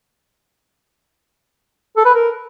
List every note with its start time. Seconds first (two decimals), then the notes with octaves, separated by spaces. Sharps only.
1.97 A4
2.05 B4
2.14 A#4